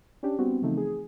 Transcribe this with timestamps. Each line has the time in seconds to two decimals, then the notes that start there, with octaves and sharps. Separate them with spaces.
0.23 C#4 D4 G4
0.39 G3 B3 C4 F#4
0.62 C#3 E3 F3 A3 C4 D#4
0.77 G#4